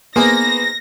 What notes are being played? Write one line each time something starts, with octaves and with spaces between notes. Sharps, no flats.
A#3 B3 D#4 G#4 C5 A#6